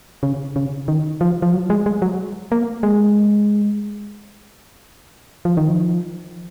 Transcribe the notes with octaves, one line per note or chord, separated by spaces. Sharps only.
C#3
C#3
D#3
F3
F3
F#3
G#3
G#3
F#3
A#3
G#3
F3
D#3
F3